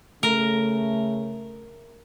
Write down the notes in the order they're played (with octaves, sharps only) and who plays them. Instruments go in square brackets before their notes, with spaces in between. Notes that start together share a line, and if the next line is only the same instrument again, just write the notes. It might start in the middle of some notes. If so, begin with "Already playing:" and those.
[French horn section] C#3 A3 [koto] A#4